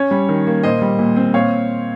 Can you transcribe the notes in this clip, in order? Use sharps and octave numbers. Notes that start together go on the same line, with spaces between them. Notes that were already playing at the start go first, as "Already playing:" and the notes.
Already playing: C#4 C#5
G3
D#3
A#3
A#2 C5 D#5
G3
A#2
C4
A#2 C#5 F5